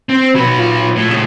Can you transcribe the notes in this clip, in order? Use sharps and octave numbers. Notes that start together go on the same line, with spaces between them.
C4
B2 F#3 B4 B5
A#2 F4
A2
A2 C#3